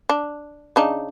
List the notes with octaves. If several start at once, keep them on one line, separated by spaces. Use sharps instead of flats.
D4
C#3 D4 D#4